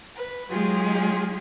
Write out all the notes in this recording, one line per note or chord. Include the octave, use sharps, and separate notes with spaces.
B4
F#3 G#3 D#4 F4 G4 G#4